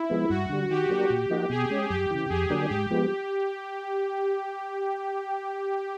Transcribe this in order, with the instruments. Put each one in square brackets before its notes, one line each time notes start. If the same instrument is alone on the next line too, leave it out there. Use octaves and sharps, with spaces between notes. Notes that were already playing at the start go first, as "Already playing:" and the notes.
Already playing: [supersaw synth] E4
[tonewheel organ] F3 G#3 B3
[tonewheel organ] G2 [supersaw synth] F#4
[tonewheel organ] D3 G3
[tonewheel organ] D#3 [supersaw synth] G4
[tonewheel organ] F#3 A#3 D4
A#2
F3 A#3 D#4 F#4
[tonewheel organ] B2 [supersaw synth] G#4
[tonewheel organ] G#3 C#4
[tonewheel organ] F#2 [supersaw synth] G4
[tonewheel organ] C#3 E3
[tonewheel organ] F2 [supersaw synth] G#4
[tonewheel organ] D3 F#3 A#3 D4
[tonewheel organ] G#2 [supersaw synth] G4
[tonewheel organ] F3 G#3 B3